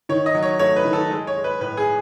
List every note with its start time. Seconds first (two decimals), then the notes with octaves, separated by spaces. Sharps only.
0.09 D#3 C#5
0.26 D#5
0.35 F#3
0.43 C#5
0.59 A3 C#5
0.76 B4
0.85 D#3
0.93 A4
1.11 G#3
1.27 C#5
1.36 G#3
1.44 B4
1.61 A2 B4
1.77 G#4